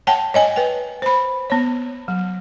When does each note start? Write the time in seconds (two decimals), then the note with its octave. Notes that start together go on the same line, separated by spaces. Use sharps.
0.07 C#5 F#5 G5 A5
0.34 C#5 D#5 G#5
0.56 B4 G5
1.02 C5 B5
1.50 B3 C#5
2.08 F#3